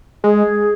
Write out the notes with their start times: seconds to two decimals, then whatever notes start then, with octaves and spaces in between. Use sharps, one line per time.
0.24 G#3 G#4